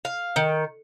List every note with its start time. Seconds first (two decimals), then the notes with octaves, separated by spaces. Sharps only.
0.05 F5
0.36 D#3